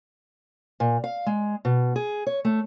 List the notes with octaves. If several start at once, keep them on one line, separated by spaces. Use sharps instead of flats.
A#2
F5
G#3
B2
G#4
C#5
A3